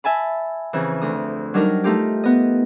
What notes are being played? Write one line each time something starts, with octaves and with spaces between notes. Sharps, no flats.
E5 G#5 A5 B5
F2 C#3 E3
D2 D#6
F#3 G3 D4 D#4 A#4
A3 D#4 F4 G4
B3 D#5